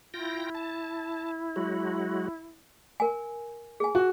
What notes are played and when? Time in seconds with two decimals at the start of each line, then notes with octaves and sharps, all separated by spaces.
0.14 E4 F4 G5 A#6
0.55 A5
1.56 F#3 G#3 F#4
3.00 A#4 G#5
3.80 G#4 G#5
3.95 F#4